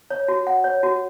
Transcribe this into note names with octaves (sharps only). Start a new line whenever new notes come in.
C#5
F#4
F#5
C#5
F#4